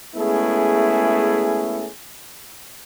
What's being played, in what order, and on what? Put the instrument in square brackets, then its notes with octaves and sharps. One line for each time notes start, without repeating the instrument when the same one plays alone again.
[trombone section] G#3 A3 B3 C#4 E4 G#4